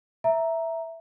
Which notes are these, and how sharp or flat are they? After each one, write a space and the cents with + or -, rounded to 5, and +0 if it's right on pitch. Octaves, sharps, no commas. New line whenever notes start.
E5 +0 A#5 +0